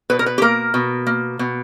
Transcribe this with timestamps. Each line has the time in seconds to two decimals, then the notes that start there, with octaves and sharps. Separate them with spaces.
0.10 B2 B4
0.19 A#4
0.26 B4
0.38 G4
0.42 A#3 A#4
0.74 B2
1.07 A#3
1.39 B2